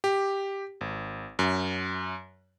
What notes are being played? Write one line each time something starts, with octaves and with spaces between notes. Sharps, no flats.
G4
G#1
F#2